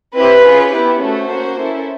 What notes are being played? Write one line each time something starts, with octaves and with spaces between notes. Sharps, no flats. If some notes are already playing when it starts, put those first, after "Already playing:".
C4 E4 G4 B4
C#4 F4 G#4
B3 E4 G4
A3 C#4 F#4 A4 C5
A#3 C#4 F#4
C#4 E4 A4